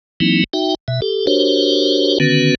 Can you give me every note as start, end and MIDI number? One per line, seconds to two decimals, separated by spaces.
0.20 0.44 52
0.20 0.44 54
0.20 0.44 58
0.20 0.44 60
0.20 0.44 63
0.20 0.44 64
0.53 0.75 63
0.53 0.75 66
0.53 0.75 76
0.53 0.75 79
0.88 1.01 47
0.88 1.01 76
1.02 1.26 67
1.02 1.26 69
1.27 2.18 62
1.27 2.18 66
1.27 2.18 67
1.27 2.18 70
1.27 2.18 72
1.27 2.18 73
2.20 2.55 50
2.20 2.55 51
2.20 2.55 59
2.20 2.55 61
2.20 2.55 66
2.20 2.55 71